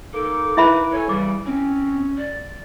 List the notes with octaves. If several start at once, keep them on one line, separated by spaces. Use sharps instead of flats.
A#3 D#4 A4 D6
E4 B4 E5 B5
A4 C#5 G#5
E2 C#3 E3 G3 D6
C4 C#4
D5